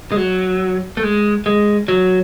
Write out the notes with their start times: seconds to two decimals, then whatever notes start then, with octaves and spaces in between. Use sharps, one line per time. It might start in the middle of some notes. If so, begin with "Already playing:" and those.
0.12 G#3
0.17 F#3
0.97 A3
1.03 G#3
1.46 G#3
1.88 F#3